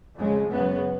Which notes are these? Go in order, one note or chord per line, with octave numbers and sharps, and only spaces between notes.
F2 C#3 G#3
F#2 C#3 B3